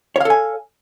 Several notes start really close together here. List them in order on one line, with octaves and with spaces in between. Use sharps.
C#5 F5 A4 G#5